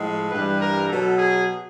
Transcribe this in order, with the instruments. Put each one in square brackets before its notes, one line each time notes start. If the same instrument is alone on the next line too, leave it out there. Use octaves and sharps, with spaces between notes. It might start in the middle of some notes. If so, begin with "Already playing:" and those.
Already playing: [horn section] A2 F3 G#3
G2 E3 G3 B4
A#4
B2 F#3 A4
G#4